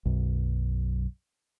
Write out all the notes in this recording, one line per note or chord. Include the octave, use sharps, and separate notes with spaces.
B1 F#2